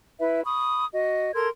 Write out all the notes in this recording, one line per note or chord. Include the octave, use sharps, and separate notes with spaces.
E4 B4 E5
B5 C#6 D#6
F#4 D#5
A4 A#4 C6 G#6